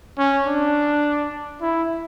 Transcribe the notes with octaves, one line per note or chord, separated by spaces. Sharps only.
C#4
D4
E4